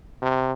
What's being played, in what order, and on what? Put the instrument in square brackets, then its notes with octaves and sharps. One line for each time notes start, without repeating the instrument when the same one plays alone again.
[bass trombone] C3